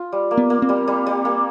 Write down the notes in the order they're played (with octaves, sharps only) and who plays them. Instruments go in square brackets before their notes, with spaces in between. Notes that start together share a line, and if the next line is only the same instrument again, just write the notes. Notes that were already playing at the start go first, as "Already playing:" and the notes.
Already playing: [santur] F4
G3
A#3
[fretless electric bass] B3
[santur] A#3
[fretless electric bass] C4
[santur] G3
G3
G3
A#3